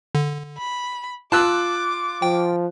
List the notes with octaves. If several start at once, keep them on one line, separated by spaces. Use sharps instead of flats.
D3
B5
F4 A5 D6 E6 F#6
F3 G5